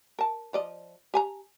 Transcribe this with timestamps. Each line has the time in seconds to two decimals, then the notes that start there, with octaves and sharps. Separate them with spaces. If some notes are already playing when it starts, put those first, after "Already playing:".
0.19 A#4 A5
0.53 F3 D5 D#5
1.14 G4 G#5 A#5